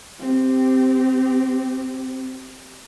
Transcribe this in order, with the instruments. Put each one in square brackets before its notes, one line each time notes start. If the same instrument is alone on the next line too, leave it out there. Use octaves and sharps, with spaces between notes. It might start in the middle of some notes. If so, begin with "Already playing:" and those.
[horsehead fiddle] C4 G4